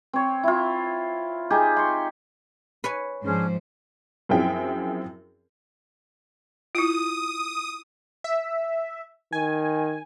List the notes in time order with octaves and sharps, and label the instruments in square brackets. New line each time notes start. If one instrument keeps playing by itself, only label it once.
[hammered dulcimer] C4 C#5
E4 F4
D#4 G4 G#4
C6 C#6
[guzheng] B4 C#5 G#5
[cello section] G#2 F3 C5 [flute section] C#4 D4 G#4
[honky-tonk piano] F#2 F3 C4 E4 G#4 G5
[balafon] E4 F4 [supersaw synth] D#6
[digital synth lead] E5
[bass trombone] D#3 [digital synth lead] G#5